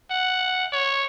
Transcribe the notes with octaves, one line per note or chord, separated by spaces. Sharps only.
F#5
C#5